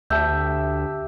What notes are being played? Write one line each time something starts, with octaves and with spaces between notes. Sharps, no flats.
D2 G4 E5 A5 G6